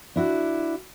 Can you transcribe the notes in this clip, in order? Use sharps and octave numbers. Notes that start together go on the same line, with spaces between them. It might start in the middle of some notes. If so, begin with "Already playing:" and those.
D4 E4 F#4